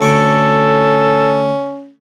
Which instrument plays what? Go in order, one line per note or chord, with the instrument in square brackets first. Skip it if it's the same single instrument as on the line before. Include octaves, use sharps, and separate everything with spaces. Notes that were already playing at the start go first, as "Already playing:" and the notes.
[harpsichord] D2 C#6 D6 [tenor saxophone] C#4 [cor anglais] A4